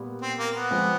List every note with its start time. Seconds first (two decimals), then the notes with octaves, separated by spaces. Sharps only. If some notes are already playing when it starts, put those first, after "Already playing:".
Already playing: A#2 G3 B3
0.22 C4
0.38 A#3
0.55 B3
0.71 F3 G#3 C4